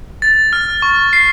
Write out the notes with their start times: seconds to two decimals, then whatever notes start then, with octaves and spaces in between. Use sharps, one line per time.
0.22 A6
0.53 F6
0.82 C#6
1.13 C7